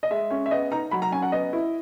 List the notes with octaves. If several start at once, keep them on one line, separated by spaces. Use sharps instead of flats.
D#5
G#3 E5
C#4
E5
B3 D#5
D#4 A#5
F#3 B5
A#5
C#4 G#5
F#5
B3 D#5
E4